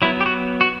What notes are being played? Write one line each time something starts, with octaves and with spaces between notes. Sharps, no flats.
F#3 B3 E4
G4
F#4
F#4